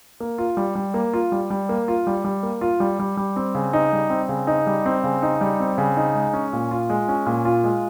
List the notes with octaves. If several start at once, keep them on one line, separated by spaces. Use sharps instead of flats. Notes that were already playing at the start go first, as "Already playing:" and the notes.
A#3
F4
G3
G3
A#3
F4
G3
G3
A#3
F4
G3
G3
A#3
F4
G3
G3
G3
C4
C#3
D#4
G3
C4
C#3
D#4
G3
C4
C#3
D#4
G3
C4
C#3
D#4
G#3
C#4
A#2
F4
G#3
C#4
A#2
F4
G#3